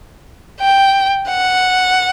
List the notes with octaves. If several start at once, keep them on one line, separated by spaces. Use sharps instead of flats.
G5
F#5